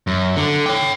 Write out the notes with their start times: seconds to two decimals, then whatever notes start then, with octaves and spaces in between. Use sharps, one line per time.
0.07 F#2
0.36 D3
0.66 C#5 G5